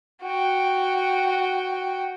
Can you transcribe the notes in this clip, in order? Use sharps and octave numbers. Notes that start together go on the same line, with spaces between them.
F#4 G5